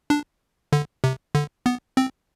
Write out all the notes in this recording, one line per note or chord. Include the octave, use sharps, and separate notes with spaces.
D4
D3
C3
D3
B3
C4